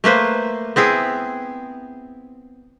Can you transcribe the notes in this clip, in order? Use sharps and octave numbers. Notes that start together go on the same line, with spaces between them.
A3 A#3 B4 C5
B3 C4 E4 G#4